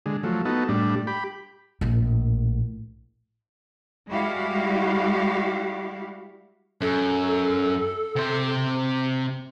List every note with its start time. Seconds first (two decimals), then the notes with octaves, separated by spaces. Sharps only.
0.06 D3 G#3
0.23 F3 F#3 A3
0.45 B3 D#4 F#4 A4
0.69 A2 G3 D4
1.07 G4 B5
1.81 A#1 A2
4.09 G3 G#3 E4 F#4 G4 F5
6.81 F#2 A4
8.16 C3 C5